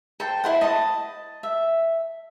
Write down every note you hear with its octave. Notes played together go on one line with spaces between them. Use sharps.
A4 C5 G5
E4 C5 F#5
D#5 A5
E5